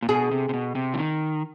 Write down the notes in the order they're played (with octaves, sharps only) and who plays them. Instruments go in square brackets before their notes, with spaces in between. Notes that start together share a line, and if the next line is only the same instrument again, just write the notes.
[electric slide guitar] A#2
[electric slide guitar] B2 [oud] G#4
[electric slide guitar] C3
C3
B2
C3
E3
D#3